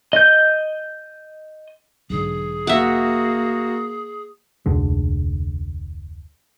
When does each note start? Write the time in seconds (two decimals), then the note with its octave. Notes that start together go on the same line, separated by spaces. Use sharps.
0.13 D#5 G6
2.10 B1 G#2 D3 G#4
2.67 A#3 F#4 E5 F#5
4.66 F1 D2 D3 G#3